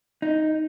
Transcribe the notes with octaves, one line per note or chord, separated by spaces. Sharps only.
D#4